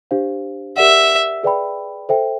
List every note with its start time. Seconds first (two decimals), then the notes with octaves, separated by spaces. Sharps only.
0.11 D4 G4 C5 F5
0.77 G4 A#4 D5 E5 F#5
1.43 G#4 B4 D5 G5 B5
2.09 A4 C5 E5 G5